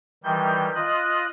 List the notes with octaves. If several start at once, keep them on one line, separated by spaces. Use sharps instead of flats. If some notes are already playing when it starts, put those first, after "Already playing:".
D#3 E3 G3 G6
F4 D#5 F#6